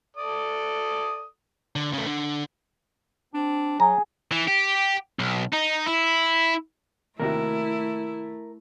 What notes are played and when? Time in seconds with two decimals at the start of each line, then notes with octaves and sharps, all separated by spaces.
0.17 A4 D5 D#6
1.76 D3
1.93 C#3 A3
2.06 D3
3.34 C4 D4
3.80 F#3 G#4 G#5 A#5
4.32 E3
4.48 G4
5.19 B1
5.53 D#4
5.87 E4
7.20 D#2 C3 A3 E4 F#4 A#4